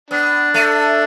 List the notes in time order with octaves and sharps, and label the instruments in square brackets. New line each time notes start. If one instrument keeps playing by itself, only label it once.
[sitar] B3 [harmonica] D4
[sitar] A3